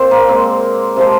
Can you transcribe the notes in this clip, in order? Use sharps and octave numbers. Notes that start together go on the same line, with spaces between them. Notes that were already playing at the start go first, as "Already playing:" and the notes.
Already playing: A#2 C4
A#3
A#2 G#3 C4
C3 F3 G#3